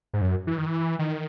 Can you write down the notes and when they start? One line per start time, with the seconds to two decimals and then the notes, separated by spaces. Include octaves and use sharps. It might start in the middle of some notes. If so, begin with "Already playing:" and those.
0.13 G#2
0.21 F#2
0.47 E3
0.57 D#3
0.66 E3
0.99 D#3